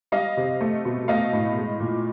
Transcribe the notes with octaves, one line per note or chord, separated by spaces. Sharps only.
G3 D#5 F5
C3
A3
B2
A3 D#5 F5
A2
G#3
A#2